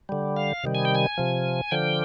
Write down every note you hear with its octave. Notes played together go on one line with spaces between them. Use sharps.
D3 G3
F5
C3 D#3 G3
G#5
G5
G#5
C3 F3
D3 F3 G5